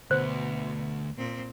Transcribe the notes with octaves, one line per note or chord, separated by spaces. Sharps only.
D2 B2 C5 F#6
A#2 C4